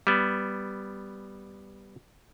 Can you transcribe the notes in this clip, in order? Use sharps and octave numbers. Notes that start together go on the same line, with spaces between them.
G3 B3